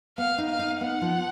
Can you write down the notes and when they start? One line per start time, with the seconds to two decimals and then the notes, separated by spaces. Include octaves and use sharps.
0.18 B3 F5
0.38 D#4
0.49 F5
0.59 D#4
0.81 B3 F#5
1.01 F3